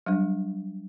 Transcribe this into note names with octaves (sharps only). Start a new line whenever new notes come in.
F#3 G3 D4